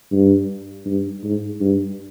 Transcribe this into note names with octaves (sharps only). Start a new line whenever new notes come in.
G2
G2
G#2
G2